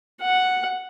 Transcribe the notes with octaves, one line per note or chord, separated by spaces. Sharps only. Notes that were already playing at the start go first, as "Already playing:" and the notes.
F#5